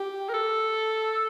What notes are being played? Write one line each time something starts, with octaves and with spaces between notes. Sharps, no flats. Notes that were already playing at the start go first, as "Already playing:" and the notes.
Already playing: G4
A#4
A4